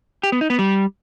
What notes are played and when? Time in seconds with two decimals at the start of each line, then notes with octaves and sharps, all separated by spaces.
0.23 G4
0.32 B3
0.41 D#4
0.50 B3
0.59 G3